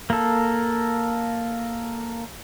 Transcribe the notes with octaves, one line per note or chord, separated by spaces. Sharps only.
A#3 A4